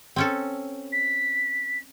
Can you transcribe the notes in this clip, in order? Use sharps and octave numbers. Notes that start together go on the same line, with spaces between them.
C4 C#4 A4
B6